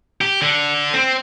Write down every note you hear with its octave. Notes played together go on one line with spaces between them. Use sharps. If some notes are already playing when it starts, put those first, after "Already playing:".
G4
D3
C4